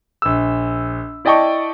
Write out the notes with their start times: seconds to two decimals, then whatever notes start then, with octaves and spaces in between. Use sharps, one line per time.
0.22 A#1 E6
1.25 E4 D5 D#5 G5 A5 C#6